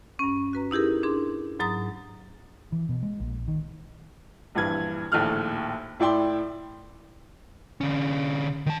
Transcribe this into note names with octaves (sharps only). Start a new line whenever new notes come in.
G2 C#4
F#4 B4 A#5
D#4 E4 G4 G#4 A#4
D4 G#4 C6
G#2 F#3 A#5 D#6 A6
E3
B2
G#3
A#1
D#3
A#1 G2 E3 B4 G#6
A#1 D#2 A2 A4 F6 F#6
A2 E4 D5 G5 C6
D3 C#4
D#3 A5